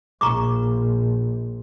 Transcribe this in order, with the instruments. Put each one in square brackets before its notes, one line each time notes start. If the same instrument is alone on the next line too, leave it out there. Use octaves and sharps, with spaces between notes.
[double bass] A#1 [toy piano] A#5 C#6 D6